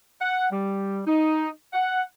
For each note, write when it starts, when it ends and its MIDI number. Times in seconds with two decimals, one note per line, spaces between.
0.20 0.46 78
0.51 1.01 55
1.06 1.49 63
1.73 2.03 78